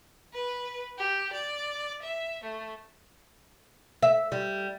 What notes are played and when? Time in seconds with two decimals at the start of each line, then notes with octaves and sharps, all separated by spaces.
0.34 B4
0.98 G4
1.33 D5
2.03 E5
2.44 A3
4.02 E5
4.32 G3